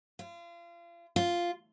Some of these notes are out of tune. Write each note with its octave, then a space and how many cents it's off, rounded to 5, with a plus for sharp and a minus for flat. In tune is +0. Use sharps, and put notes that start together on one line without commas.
F4 -35
F4 -5